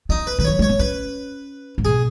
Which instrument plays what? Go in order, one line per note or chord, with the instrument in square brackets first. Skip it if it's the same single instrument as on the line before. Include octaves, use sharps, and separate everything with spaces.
[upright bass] B3 [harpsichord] D#4
[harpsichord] B4
[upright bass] D#3 [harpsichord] B4
[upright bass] F#3 [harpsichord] C#5
[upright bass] G#3 [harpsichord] C#5
[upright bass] B3
[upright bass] C#4 [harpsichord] B4
[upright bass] G#2
[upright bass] B2 [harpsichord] G#4